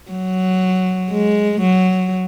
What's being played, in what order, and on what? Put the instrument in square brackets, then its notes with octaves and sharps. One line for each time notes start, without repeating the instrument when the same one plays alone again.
[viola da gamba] F#3
G#3
F#3